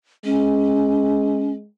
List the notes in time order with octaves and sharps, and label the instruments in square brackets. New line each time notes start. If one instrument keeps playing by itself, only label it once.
[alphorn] G#3 [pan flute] C#4